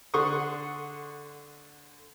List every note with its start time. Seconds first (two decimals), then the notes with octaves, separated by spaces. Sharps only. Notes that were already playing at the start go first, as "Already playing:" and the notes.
0.14 D3 F#5 C6 C#6 D#6